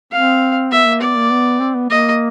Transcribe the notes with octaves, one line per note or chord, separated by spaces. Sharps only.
C4 F5
B3 E5
A#3
B3 D5
A#3
B3
C4
B3
A#3 D#5